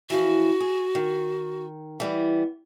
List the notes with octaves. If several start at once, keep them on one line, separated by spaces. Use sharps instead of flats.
E3 F3 F#4
G#4
D#3
E3 G3 B3